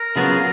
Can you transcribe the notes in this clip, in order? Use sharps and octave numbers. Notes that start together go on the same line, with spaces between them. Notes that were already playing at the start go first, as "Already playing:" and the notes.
Already playing: A#4
C#3 F#3 B3 F4 G#4